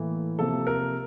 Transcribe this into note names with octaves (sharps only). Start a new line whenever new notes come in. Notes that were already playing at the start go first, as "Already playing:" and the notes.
Already playing: A2 E3 A#3
C3 F3 A#3 A4
A#4